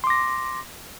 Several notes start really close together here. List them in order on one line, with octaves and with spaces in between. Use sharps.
C6 D6 A#6